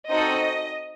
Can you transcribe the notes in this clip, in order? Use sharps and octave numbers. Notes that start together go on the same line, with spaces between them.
C4 D#4 F#4 A4 D#5